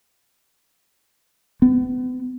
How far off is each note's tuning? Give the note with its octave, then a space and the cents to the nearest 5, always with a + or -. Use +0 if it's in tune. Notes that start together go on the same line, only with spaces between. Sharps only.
B3 +35